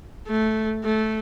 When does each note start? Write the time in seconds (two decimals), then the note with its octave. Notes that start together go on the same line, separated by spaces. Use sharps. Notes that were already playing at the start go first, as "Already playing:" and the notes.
0.27 A3
0.84 A3